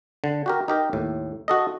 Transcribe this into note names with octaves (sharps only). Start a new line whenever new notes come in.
D3
F#4 G4 A#4
D#4 G4 A#4
D#2 A2
F#4 A4 D#5